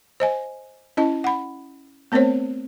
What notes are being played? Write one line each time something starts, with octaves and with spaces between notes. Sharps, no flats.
C5 D#5 G#5
C#4 E4 D#5 A5
F#5 B5
A3 B3 C4 A#4 C5 C#5